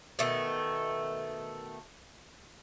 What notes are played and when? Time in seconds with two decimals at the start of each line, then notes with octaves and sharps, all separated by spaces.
0.19 B2 D#3 A3